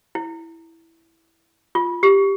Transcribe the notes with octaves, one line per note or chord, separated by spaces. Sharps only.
E4
F4
G4